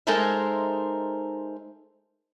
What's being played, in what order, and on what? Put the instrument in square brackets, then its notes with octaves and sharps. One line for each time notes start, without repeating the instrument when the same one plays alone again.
[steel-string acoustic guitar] G#3 D#4 A4 A#4 C5 E5